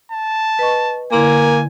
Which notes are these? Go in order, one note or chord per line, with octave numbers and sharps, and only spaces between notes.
A5
B4 D#5 C#6
D3 A#3 E4 G#5 C6